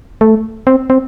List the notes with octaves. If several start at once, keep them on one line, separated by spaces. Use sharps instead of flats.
A3
C4
C4